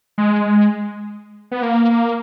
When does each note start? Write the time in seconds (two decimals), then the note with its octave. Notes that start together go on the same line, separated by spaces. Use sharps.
0.18 G#3
1.51 B3
1.62 A#3